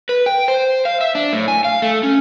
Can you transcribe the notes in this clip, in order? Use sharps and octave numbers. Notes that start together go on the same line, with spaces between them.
B4
G5
C5
F5
E5
D4
A2
G#5
F5
A3
C#4